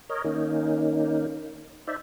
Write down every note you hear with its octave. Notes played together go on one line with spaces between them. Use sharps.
A#4 C#5 D#5
D#3 A#3 C#4 D#4
D#4 C5 D5 E5